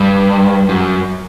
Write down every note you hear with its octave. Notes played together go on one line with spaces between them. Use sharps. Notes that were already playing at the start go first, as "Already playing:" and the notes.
Already playing: G2
F#2